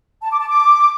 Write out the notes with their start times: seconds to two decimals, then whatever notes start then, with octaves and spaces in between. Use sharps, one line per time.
0.22 A5
0.31 D6
0.40 A5
0.49 D6